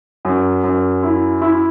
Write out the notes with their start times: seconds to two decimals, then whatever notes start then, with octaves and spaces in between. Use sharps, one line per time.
0.25 F#2
0.64 F#2
1.03 E4
1.42 E4